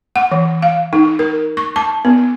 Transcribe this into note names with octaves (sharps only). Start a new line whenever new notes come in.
F#5
E3
F5
D#4
A#4
C#6
A5
B3